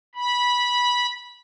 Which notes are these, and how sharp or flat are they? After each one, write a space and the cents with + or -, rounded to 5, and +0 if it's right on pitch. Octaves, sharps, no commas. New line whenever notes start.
B5 -15